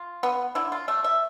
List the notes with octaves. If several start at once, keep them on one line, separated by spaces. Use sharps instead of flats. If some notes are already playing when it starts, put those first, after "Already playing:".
Already playing: F4
B3
D3 E4
F4
A3 E5
E5